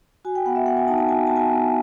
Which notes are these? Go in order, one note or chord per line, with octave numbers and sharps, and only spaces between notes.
F#4 G#5
G5
B3 F#5
E5
B3 F#5
G#5
D#4 A5
A5
F#4 G#5
B3 A5
G#5
B3